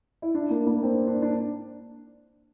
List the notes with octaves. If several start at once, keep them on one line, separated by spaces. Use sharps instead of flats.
E4
D4
A#3
A#3
C4
D4
D4